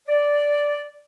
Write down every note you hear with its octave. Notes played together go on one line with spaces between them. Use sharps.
D5